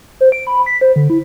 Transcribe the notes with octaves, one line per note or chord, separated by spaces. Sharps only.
C5
D7
B5
B6
C5
D3
E4